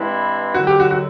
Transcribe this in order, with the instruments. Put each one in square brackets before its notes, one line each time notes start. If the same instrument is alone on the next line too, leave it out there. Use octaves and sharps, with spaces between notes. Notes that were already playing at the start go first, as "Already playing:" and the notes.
Already playing: [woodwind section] G2 E3 G#3 C4 E4
[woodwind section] D#2 D3 F#3 [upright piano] F#4
[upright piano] G4
F#4
F#4